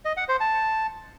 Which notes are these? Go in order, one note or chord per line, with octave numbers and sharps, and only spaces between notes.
D#5
F#5
C5
A5